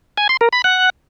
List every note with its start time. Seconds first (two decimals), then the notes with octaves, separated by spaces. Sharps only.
0.18 G#5
0.29 C6
0.41 A#4
0.53 B5
0.64 F#5